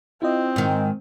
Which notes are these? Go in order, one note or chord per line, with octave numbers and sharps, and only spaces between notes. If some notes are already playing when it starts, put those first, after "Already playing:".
C4 E4 F4 D#5
G#2 D#3